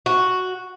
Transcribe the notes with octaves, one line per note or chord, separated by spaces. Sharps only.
F#4